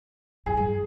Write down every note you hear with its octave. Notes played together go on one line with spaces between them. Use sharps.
F2 G#4
G2